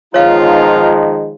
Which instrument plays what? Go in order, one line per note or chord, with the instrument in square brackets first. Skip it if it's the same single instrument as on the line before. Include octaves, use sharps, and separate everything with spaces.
[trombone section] D#3 F3 G#3 [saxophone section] B3 D#4 F4 [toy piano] C#5 F5